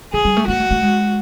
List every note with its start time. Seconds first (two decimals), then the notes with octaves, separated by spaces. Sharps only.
0.13 D3 G#4
0.25 G3
0.37 A3
0.48 A#3 F#4
0.60 A3
0.71 A3
0.83 G#3